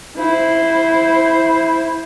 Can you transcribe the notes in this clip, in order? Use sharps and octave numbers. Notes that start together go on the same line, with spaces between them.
E4 C5